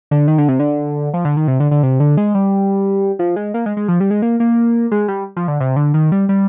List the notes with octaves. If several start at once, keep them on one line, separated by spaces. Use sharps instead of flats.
D3
D#3
D3
C3
D3
F3
D3
D#3
C3
D3
D3
C3
D3
G#3
G3
F3
G#3
A#3
G#3
G#3
F3
G3
G#3
A#3
A#3
G#3
G3
F3
D3
C3
D3
D#3
G3
G3